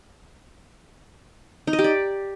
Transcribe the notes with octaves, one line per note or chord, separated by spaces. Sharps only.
D#4
D#5
G4
D5